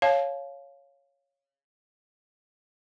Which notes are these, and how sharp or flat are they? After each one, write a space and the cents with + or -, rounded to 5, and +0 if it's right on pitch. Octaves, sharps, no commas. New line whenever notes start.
C#5 +0 F5 +0 A5 -35